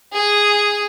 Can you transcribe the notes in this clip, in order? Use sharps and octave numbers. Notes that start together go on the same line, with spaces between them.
G#4